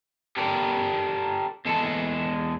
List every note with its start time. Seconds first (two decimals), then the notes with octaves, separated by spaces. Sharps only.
0.37 G4 A4 A#4 D5
1.65 E2 G#3 A4 A5